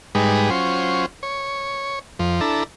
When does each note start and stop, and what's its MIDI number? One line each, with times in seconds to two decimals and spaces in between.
0.15 0.50 44
0.15 0.50 55
0.15 0.50 56
0.15 0.50 63
0.15 0.50 71
0.50 1.06 54
0.50 1.06 61
0.50 1.06 65
0.50 1.06 72
1.23 1.99 73
2.19 2.41 41
2.19 2.41 53
2.41 2.64 62
2.41 2.64 64
2.41 2.64 69
2.41 2.64 82